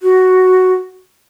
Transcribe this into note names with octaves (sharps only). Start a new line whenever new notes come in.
F#4